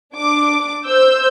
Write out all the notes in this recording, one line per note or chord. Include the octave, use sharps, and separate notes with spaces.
D4 D6
C5 E6 G6